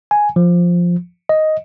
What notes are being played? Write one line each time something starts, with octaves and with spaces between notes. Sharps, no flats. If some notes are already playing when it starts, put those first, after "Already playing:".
G#5
F3
D#5